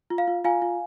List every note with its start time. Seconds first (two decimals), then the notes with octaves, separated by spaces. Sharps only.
0.10 F4
0.18 F5
0.28 F4
0.44 F4 F5 G#5
0.62 F4